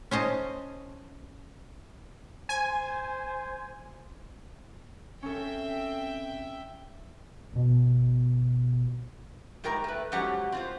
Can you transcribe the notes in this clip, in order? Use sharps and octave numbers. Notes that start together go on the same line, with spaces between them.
C#4 C5 D#5 A5
C5 G#5
C4 C#4 A4 E5 G5
G1 B2
G#2 G3 A#4 G5 A#5
A3 B4
G#2 F3 F#3 C#4 G4 F#5
C4 F4 C5